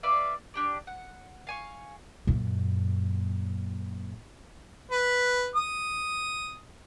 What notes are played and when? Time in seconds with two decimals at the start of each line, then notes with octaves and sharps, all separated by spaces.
0.03 B4 D5 E5 F5
0.54 D4 G4 D5
0.87 F#5
1.47 F5 G#5 C#6
2.27 F#2 A#2
4.91 B4
5.55 D#6